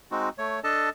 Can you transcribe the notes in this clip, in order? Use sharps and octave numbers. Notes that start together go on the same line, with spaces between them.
G#3 C4 D#4 F#4
A3 C#5
D4 A4 D#5 A5